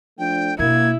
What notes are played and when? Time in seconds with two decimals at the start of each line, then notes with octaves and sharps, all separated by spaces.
0.19 F3 A3 D4 G5
0.59 B2 A#3 D4 E4 G#6